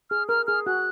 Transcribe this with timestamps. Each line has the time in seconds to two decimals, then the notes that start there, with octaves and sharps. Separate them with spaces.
0.10 G#4 F6
0.29 A#4 F6
0.47 G#4 F6
0.67 F#4 F#6